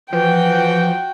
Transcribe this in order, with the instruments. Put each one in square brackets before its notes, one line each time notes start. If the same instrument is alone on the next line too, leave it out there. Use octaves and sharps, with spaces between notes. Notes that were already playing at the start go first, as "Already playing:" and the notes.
[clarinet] E3 [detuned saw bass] F3 [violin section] F#4 G5